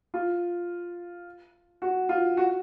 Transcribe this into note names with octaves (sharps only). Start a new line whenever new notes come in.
F4
F#4
F4
F#4